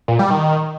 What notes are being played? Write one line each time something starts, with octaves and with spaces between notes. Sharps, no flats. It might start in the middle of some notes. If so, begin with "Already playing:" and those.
A#2
G3
D#3